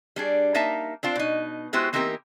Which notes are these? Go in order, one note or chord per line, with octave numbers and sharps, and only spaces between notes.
G3 D4 G#4
A#3 D#4 E5 A5
C4 D4 F4
B2 D#4
G#3 B3 E4 F#4 G4 C5
E3 A#3 C4 D#4 G4 A#4